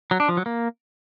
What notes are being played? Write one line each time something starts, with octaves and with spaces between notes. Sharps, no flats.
F#3
D4
F3
F#3
A#3